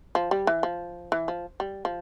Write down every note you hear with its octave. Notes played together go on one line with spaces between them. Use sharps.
F3
G3
E3
F3
E3
F3
G3
F3